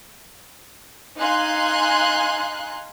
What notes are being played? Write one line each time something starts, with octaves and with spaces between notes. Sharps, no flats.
D#4 F5 G#5 C6 F#6